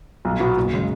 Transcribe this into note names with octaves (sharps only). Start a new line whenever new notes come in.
B1
B2 B3 F#4
F#1
C#3 G#3